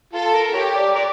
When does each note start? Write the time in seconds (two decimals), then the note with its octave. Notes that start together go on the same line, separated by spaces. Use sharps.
0.13 F4 A4
0.34 A#4
0.54 G4 A#4 C#5
0.75 D5
0.95 A#4 D5